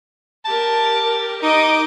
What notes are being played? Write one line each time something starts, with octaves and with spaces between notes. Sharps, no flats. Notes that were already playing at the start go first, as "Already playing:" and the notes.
G4 A#4 A5
D#4 D#5 D6